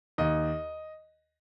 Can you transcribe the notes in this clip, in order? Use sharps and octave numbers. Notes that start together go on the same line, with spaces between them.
D#2 D#5